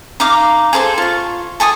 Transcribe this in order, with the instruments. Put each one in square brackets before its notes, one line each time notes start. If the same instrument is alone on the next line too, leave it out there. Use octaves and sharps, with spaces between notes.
[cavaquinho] D#4 F5 D6
G#4 A4 C5 G#5
F4 C#6
A4 G#5 C#6 D#6